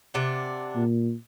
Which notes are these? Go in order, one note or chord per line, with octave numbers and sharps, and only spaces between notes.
C3 D4 F#5
A#2